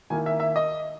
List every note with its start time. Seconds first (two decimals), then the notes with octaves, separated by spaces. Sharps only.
0.10 D#3 A#3 E4 G#5
0.26 E5
0.40 E5
0.56 D#5